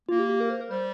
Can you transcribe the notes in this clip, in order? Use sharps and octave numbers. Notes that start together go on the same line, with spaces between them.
A#3 F4
G4
G4
A#4
C5
A#4
G3 C5